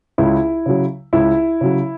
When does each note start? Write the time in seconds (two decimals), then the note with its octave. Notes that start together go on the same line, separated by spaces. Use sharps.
0.18 C#2 E4
0.66 C#3 F#3
1.13 C#2 E4
1.61 C#3 F#3